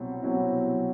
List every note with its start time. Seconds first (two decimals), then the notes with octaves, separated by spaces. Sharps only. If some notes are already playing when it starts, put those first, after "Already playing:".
Already playing: C2 B2 F#3 C4 E4
0.23 C2 B2 F#3 C4 E4